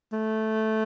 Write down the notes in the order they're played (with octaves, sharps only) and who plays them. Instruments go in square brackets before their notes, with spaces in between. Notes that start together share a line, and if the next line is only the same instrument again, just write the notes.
[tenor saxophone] A3